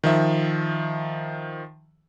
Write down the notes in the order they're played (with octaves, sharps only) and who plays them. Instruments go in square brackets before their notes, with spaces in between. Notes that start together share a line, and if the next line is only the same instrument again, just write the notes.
[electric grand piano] D#3 F3 E5